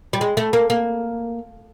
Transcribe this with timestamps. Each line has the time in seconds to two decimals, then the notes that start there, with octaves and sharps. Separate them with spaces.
0.13 G3
0.21 G#3
0.37 A3
0.53 A#3
0.70 A#3